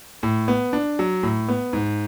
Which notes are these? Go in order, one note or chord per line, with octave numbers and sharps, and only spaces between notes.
A2
B3
D4
F#3
A2
B3
G#2